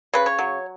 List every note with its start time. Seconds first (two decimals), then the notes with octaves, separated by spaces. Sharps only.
0.14 C#3 B4
0.26 C#5
0.39 F#3